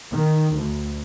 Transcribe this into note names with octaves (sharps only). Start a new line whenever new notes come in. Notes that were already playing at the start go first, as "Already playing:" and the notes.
D#3
D2